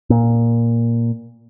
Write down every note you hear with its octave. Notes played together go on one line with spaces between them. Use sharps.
A#2